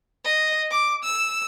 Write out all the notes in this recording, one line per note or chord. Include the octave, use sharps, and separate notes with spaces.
D#5
D6
E6